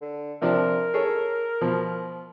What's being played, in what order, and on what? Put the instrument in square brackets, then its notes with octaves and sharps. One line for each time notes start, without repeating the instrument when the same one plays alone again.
[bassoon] D3
[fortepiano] C3 F3 D4 [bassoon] A#4
[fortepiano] G#4 A4 C#5
B2 F3